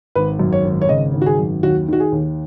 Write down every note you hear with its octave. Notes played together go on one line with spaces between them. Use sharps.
G#1 B4
F#2
C#5
G#1
C#5
C#3 D#5
G#1
F#4
G#4
F#2
D#2 F#4
D#3 F#4
G#4
D#2